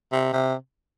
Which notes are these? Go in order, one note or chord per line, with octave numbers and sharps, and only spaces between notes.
C3
C3